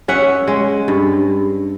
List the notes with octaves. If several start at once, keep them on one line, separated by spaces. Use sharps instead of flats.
C#4 E5 F#5
G#3
G2